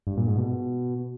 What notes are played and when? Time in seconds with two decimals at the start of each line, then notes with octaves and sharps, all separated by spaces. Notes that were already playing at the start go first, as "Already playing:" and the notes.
0.07 G2
0.17 A#2
0.27 G#2
0.38 B2